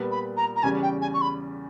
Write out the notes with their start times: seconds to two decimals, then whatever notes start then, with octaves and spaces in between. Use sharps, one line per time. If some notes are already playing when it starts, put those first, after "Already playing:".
Already playing: A#2 G3 B3
0.11 B5
0.37 A#5
0.56 A#5
0.63 E2 C#3 G3 C#4 G#5
0.82 G5
1.01 G#5
1.14 C#6
1.21 B5